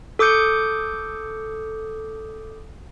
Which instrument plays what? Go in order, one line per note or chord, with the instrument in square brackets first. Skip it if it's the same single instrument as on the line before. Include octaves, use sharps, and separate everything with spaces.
[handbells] A4 D6 D#6 G6 C#7